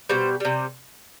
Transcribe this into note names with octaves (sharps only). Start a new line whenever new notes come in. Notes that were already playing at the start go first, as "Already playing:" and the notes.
B2 G3 C5
C3 G3